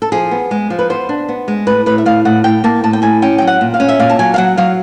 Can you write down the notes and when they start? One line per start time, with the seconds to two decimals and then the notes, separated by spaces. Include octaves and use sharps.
0.02 A4
0.12 F3 G#4
0.31 B3
0.51 G#3
0.70 F3
0.79 B4
0.90 B3 C5
1.09 D4
1.29 B3
1.48 G#3
1.67 A2 B4
1.86 A2 B4
1.98 E5
2.06 A2 F5
2.25 A2 F#5
2.44 A2 G5
2.64 A#3 A5
2.84 A2 A5
2.93 G5
3.02 A2 G#5
3.22 C#4 G5
3.38 F#3 G5
3.47 F#5
3.61 A#2
3.74 F5
3.80 C#4
3.89 E5
3.99 A#2 F5
4.09 A5
4.19 F#3 G#5
4.34 F5
4.38 F#3 F#5
4.57 F#3 F5